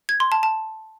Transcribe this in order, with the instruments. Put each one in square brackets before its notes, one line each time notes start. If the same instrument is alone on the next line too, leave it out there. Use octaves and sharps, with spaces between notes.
[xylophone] G#6
C6
A5
A5